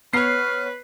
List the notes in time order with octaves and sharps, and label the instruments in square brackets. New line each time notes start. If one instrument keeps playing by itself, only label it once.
[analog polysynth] B3 C#5 [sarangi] B4 [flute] F6 [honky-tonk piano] C7